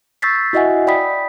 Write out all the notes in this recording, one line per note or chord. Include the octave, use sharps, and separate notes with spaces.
C#6 E6 G6 A6 B6 C7
E4 F#4 D#5 E5 F#5 G#5
D5 G5 B5 D#6 B6